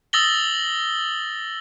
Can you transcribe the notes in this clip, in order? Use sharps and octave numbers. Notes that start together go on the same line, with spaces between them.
D#6 E6 A6 A#6 F#7 G7